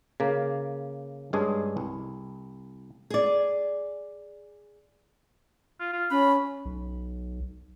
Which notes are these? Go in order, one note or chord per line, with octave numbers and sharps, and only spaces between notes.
C#3 A#3
G2 G#3 C#4 D4 G#4
C2
G#4 D5
F4
F4
C#4 B5
B1